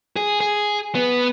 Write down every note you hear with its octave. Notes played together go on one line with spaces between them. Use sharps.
G#4
G#4
B3